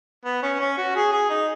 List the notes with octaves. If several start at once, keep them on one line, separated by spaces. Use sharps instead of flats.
B3
C#4
C#4
F#4
G#4
G#4
D#4